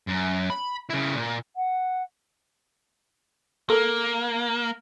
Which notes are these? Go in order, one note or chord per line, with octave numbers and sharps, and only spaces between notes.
F#2
B5
C#3 E4
A#2
F#5
A#3 A4 A#4